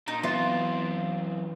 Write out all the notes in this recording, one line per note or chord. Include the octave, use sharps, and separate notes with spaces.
A#2 D#4
F#2 E3 B3 C4 F4 E5